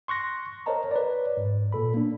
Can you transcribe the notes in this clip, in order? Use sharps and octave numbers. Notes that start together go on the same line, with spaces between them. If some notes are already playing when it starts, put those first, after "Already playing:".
C6 C#6 F#6 A#6
A#4 C5 C#5 D#5 A5 A#5
B4 C#5 D5
G#2
A#2 A4 B5
A#3 D4